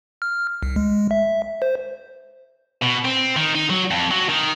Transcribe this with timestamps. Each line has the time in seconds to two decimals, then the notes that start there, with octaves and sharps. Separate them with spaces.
0.22 F6
0.63 C2
0.76 G#3
1.11 E5
1.62 C5
2.82 B2
3.05 C4
3.36 D#3
3.55 D#4
3.70 F#3
3.91 F2
4.11 F#3
4.29 D#3